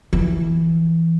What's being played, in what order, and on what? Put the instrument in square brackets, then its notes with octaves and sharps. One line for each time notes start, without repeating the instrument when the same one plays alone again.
[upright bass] E3